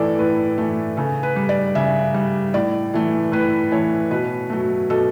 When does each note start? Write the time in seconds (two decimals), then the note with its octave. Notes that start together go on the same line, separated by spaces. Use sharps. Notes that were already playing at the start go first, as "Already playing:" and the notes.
Already playing: A2 E3 A3 A4 D5
0.19 A2 B4
0.58 E3 A3
0.97 C#3 A4
1.23 B4
1.36 G3
1.49 D5
1.75 C#3 E5
2.14 G3
2.54 A2 D5
2.94 E3 A3
3.32 A2 B4
3.71 E3 A3 C#5
4.11 B2 B4
4.50 F#3 A3
4.90 B2 A4